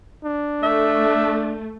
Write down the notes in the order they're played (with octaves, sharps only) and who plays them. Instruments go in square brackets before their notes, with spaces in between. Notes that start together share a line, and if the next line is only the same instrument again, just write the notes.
[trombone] D4
[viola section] A3 [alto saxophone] E5